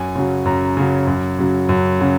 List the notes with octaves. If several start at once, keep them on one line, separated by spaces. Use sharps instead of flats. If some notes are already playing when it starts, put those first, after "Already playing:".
Already playing: F#2 G#5
C#3 F#3
F#2 A#5
C#3 F#3
F#2
C#3 F#3
F#2
C#3 F#3